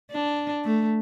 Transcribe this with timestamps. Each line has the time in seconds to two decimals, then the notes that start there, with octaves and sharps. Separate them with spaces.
0.11 D4
0.64 A3